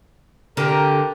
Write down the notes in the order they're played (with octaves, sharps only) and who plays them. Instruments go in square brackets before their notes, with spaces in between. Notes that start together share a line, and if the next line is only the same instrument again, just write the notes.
[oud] D3 [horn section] G4 A#4